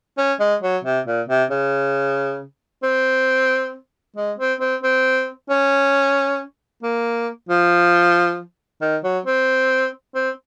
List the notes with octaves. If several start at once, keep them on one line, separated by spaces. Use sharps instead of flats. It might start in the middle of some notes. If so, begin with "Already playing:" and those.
C#4
G#3
F#3
C3
A#2
C3
C#3
C4
G#3
C4
C4
C4
C#4
A#3
F3
D#3
F#3
C4
C4